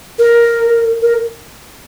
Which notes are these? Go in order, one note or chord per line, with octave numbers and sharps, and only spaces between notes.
A#4
A#4